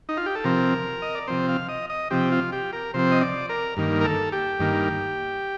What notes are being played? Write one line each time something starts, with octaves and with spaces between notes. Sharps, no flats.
D#4
F4
G4
A4
C3 F3 C4 A#4
D#5
D5
C3 F3 C4 C5
F5
D#5
D#5
C3 F3 C4 G4
F4
G4
A#4
C3 F3 C4 C5
D#5
D5
A#4
G2 D#3 A#3
A#4
A4
G4
G2 D#3 A#3